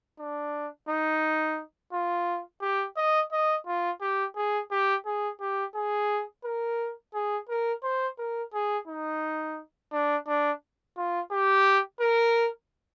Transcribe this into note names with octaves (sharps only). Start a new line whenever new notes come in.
D4
D#4
F4
G4
D#5
D#5
F4
G4
G#4
G4
G#4
G4
G#4
A#4
G#4
A#4
C5
A#4
G#4
D#4
D4
D4
F4
G4
A#4